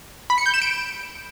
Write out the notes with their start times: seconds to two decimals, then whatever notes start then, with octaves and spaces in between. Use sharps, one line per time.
0.30 B5
0.38 C#7
0.46 G6
0.54 E7
0.62 D7